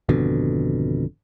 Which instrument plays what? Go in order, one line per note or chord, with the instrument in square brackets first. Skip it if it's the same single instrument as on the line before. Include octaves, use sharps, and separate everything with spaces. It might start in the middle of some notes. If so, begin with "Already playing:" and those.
[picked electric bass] G#1 F2 B2 D3